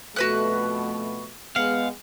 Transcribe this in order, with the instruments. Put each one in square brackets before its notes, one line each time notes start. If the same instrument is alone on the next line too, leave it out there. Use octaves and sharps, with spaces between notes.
[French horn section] F2 B2 A3 [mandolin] F#4 B4 F#6
[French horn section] G#3 B3 [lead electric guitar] F5 [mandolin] F#5